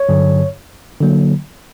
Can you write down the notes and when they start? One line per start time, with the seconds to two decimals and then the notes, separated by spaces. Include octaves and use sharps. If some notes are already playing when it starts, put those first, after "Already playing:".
Already playing: C#5
0.09 G2 D3 F#3
1.01 D3 F#3 A#3